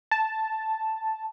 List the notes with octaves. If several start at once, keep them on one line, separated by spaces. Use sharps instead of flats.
A5